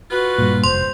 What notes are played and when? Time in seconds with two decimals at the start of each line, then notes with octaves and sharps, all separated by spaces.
0.11 F4 F#4 B4
0.38 G2 A#2
0.64 F1 C5 C6